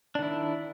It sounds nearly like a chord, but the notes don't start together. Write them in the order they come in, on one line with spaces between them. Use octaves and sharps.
D4 D#3 E4